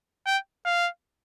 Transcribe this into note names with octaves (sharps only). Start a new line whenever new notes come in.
G5
F5